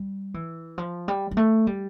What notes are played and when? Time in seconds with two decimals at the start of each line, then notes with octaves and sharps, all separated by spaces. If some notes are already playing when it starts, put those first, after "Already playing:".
Already playing: G3
0.34 E3
0.78 F3
1.08 G3
1.31 G3
1.37 A3
1.67 G3